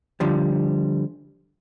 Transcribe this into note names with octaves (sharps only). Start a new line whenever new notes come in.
D3 F3 G3